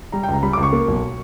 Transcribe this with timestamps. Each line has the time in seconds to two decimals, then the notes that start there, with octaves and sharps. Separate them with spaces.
0.12 G3 A#5
0.23 G5
0.28 C#2
0.33 A#5
0.43 G3 B5
0.53 C#2 D6
0.63 C#6
0.73 A#3
0.88 B1